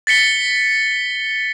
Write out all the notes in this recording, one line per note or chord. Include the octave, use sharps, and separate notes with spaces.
A6 B6 C#7 G7